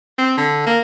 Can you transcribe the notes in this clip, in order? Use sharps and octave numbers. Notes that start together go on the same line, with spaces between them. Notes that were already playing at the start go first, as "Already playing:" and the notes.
C4
D3
A#3